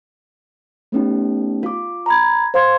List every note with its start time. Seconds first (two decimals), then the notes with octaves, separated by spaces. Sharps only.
0.92 A3 B3 C#4 D#4 G4
1.63 F4 D6
2.06 A#5 B5 G#6
2.54 C5 F5 C6 G#6